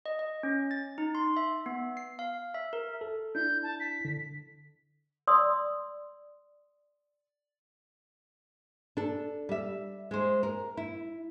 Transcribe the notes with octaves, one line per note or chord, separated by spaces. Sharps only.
D#5
D#5
C#4
A6
D#4
C6
E5
B3
C7
F5
E5
A#4
A4
D4 E4 G6
A5
B6
D3
D5 C6 D#6 E6
D4 A4
G3 E5
G#3 C5
A#4
E4